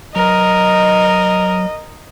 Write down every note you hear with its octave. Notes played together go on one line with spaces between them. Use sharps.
F#3 A#4 D#5